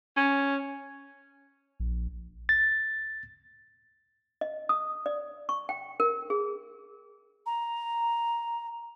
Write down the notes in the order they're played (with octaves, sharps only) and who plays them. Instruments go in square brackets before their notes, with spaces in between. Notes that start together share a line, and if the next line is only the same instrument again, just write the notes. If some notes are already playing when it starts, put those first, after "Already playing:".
[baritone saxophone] C#4
[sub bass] A#1
[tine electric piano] A6
[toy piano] D#5
D#6
D5
C#6
G5
A#4
G#4
[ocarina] A#5